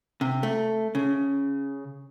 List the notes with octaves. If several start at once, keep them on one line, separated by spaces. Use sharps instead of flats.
C3
A3
C#3